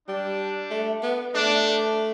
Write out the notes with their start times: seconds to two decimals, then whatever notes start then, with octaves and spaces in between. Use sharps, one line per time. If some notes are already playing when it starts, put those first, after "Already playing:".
0.08 G3 D4
0.70 A3
1.03 B3
1.34 A3 D4